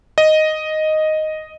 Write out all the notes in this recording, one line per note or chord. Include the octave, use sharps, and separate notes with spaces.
D#5